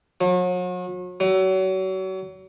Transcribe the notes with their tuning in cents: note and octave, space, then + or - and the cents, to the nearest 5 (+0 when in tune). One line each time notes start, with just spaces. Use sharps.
F#3 -40
F#3 +35